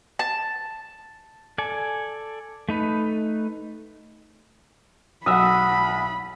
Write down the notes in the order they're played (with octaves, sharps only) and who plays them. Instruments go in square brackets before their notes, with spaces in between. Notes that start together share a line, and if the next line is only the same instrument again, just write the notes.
[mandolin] A5
[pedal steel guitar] A4 D5 G#5
A3 D#4 B4
[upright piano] B1 [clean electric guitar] E5 [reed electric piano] F#5 D#6 [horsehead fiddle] B5